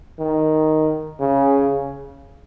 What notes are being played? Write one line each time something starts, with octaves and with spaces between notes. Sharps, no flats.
D#3
C#3